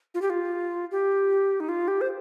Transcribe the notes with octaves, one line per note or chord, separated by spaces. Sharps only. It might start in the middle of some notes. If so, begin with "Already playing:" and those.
F4
G4
F4
G4
D#4
F4
G4
C5